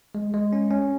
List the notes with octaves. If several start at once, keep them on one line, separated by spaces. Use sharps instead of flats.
G#3
G#3
C#4
C#4